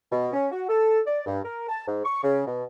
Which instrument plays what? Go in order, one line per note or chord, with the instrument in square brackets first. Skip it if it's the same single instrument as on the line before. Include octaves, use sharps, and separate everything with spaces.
[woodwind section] B2
C#4
F#4
A4
D5
G2
A#4
A5
G#2
C#6
C#3
B2